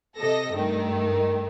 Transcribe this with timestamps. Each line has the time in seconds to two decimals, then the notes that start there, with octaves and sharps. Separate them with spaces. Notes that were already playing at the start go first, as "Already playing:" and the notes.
0.18 C3 A4 D#5 A#6
0.54 G2 D#3 A3